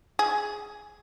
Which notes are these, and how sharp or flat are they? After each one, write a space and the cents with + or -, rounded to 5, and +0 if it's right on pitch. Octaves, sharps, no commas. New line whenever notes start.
G#4 +5